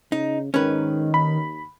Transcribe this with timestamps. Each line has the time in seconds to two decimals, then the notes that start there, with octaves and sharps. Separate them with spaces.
0.12 C#3 D#4
0.54 G#2 D#3 C#4 B4
1.14 D#2 B5